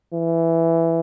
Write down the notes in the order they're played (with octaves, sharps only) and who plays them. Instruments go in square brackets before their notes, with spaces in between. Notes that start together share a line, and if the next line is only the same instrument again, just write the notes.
[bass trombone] E3